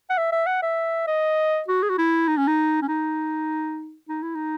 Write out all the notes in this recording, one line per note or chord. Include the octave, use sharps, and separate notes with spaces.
F#5
E5
E5
F#5
E5
D#5
F#4
G#4
F#4
E4
D#4
C#4
D#4
C#4
D#4
D#4
E4
D#4